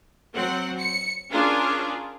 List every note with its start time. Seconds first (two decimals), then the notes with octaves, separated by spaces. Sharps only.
0.35 F#3 C4 F#5
0.78 C#7
1.30 C#4 D4 F4 G#4 A#4